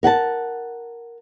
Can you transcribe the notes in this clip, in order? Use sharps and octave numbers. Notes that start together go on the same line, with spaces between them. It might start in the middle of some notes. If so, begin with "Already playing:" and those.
A#4 F#5 G#5 A5